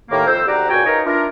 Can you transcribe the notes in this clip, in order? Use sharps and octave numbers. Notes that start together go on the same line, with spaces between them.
D#2 A2 D#3 A#3
F2 C5 E6
D2 G#2 G4 D5 F#5 A#5
C#2 A#2 F#4 G5 G#5
D#4 A#4 B4 C#5 D#5 F5
D4 E4 F4 A#4